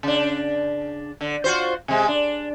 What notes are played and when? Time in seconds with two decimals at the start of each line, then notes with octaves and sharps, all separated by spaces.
0.03 C#3 D4
1.21 D3
1.44 F4 F#4 C5
1.88 C3 G#3
2.08 D4